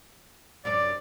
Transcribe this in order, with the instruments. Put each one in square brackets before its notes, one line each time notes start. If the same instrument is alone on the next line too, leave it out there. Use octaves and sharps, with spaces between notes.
[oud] F#2 C3 D4 [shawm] D5